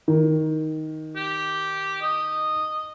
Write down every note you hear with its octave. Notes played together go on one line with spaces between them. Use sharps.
D#3
G4
D#5